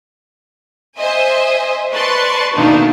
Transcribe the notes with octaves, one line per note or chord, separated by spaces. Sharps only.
C5 D#5 E5 G#5
B4 D5 A5 C6 C#6
B2 D#3 A3 A#3 D4 D#4